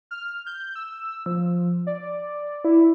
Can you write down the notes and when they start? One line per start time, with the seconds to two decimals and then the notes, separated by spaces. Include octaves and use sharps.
0.11 F6
0.46 G6
0.75 E6
1.26 F3
1.87 D5
2.64 E4